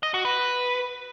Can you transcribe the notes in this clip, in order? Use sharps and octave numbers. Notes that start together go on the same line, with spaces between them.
D#5
F#4
B4